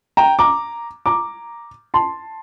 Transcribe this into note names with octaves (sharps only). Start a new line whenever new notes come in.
G5 A#5
A#5 D6
A#5 D6
A5 C6